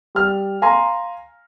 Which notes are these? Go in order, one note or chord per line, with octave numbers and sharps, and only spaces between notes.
G3 F6
F5 G#5 A#5 C6